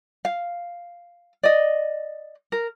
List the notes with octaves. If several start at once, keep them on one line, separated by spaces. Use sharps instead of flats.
F5
D5 D#5
A#4